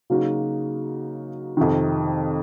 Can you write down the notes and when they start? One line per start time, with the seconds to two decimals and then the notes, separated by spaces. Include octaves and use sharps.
0.10 C#3 F#3 A#3 D#4 F#4
1.57 F2 C3 D#3